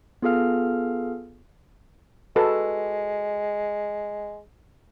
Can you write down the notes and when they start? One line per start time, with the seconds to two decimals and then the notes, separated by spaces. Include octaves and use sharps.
0.22 B3 F4 G#4 A4 F5 F6
2.36 G#3 F#4 A4 B4